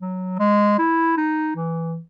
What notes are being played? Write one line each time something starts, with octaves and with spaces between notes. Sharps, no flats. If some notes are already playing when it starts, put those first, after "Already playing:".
F#3
G#3
E4
D#4
E3